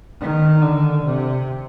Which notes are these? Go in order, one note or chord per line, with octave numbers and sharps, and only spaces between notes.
D#3
D3
C3